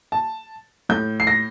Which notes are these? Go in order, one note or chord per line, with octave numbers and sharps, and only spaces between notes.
A5
A2 G6
C7
A#6